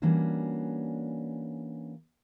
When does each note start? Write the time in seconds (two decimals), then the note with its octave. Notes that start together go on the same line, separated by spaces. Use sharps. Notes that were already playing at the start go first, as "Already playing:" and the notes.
0.02 E3 G3 A#3 C#4 D4 F#4